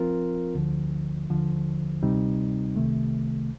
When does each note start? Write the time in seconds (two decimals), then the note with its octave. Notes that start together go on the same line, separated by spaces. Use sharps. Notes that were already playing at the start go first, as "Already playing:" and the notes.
Already playing: F3 C4 F4 A#4
0.55 D2 D3 F3
1.29 D#2 D3 F3
2.03 D2 C3 G3 C4 D#4
2.76 C2 C3 D#3 A3